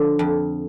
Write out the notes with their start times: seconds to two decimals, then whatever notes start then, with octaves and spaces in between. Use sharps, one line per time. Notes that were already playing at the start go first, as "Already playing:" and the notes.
Already playing: D3 F3
0.19 F2